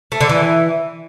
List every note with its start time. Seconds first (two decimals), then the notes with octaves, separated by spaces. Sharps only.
0.12 A3
0.21 D3
0.29 E3